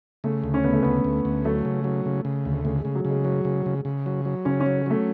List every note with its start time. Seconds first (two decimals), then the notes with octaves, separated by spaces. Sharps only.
0.24 C#3 A3
0.44 D2
0.54 C#4
0.64 C#3 B3
0.73 A3
0.83 D2 B3
1.04 D2
1.25 D2
1.45 F#3 A3
1.65 C#3
1.84 F#3
2.05 C#3
2.25 C#3
2.45 D2
2.64 C#3 A3
2.80 C#3 G#3
2.95 F#3
3.05 C#3
3.10 G#3
3.25 F#3
3.45 C#3
3.66 C#3
3.85 C#3
4.06 F#3
4.25 F#3
4.45 C#3 C#4
4.60 C#4
4.66 F#3
4.86 F#3 A3